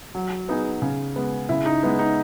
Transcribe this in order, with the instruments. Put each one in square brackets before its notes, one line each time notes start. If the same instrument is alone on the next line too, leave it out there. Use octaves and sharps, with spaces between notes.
[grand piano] F#3
B3 D#4 G#4
C#3
G#3 B3
[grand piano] C#3 [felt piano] E4
[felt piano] D#4
[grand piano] G#3 B3 E4
[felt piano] D#4